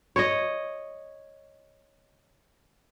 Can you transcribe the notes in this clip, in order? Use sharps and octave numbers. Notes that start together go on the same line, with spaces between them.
C#5 D#5